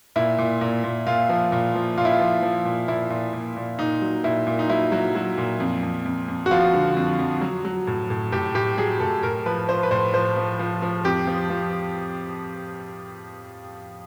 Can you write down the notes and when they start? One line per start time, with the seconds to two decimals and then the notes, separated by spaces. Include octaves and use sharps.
0.16 A#2 E4
0.38 A#2
0.61 A#2
0.84 A#2
1.07 A#2 F4
1.29 F3
1.52 A#2
1.75 F3
1.97 A#2 F4
2.05 E4
2.13 F4
2.20 F3
2.42 F3
2.65 A#2
2.88 A#2 E4
3.10 A#2
3.33 A#2
3.57 A#2
3.79 A#2 D#4
4.02 F#3
4.24 A#2 E4
4.47 A#2
4.59 D#4
4.69 F#3 E4
4.92 F#3
5.15 F#3
5.38 A#2
5.60 F2
5.83 F2
6.05 F2
6.28 F2
6.46 F#4
6.51 F3 F4
6.74 D3
6.97 F2
7.19 F2
7.41 F#3
7.65 F#3
7.87 A2
8.10 A2
8.32 A2 G4
8.55 A2 G4
8.78 F#3 G#4
9.00 A2 A4
9.23 A2 A#4
9.46 F3 B4
9.68 F3 C5
9.83 B4
9.91 A2 C5
10.14 F3 C5
10.36 F3
10.59 F3
10.82 F3
11.04 F2 G4
11.27 F3
11.50 F3